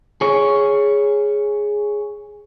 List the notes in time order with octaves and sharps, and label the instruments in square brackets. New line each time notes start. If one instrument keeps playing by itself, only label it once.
[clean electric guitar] G#4 C#5